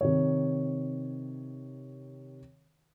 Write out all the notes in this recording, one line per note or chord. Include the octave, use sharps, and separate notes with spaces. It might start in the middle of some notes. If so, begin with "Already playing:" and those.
C3 D#3 C#5